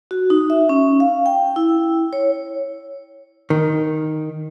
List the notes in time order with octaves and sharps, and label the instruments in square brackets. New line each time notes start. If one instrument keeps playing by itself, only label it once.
[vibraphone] F#4
D#4
E5
C#4
F5
G5
E4
C#5
[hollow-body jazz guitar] D#3